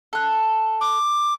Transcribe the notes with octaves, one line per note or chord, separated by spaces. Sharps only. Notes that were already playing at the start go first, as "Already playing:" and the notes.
A4 F#6
D6